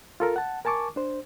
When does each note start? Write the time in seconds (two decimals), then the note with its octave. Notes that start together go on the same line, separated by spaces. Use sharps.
0.20 F4 A4 A#4
0.36 F#5 A5
0.65 A#4 G#5 A5 C#6 D6
0.96 D4 C5